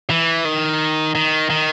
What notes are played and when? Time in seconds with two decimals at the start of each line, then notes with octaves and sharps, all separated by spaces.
0.10 E3
0.45 D#3
1.15 D#3
1.50 D#3